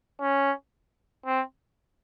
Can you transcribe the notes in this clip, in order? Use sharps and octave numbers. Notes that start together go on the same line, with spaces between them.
C#4
C4